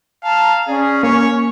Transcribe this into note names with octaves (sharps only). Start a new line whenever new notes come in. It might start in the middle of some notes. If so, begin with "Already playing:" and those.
F5 A5 A#5
C#4 G#4 D5
A#3 C#5 C#6